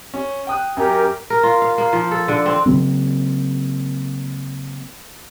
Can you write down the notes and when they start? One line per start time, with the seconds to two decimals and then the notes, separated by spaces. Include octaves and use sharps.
0.14 C#4
0.47 G5 D#6 F#6
0.77 F#2 G4 A#4
1.30 A#4
1.43 F4
1.62 F5
1.78 A#3
1.93 F3
2.11 A4
2.28 D3
2.46 C4
2.66 C#3 F#3 A#3 C4